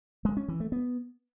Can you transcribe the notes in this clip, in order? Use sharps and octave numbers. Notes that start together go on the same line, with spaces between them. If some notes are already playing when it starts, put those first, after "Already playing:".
G#3
C#4
E3
A3
B3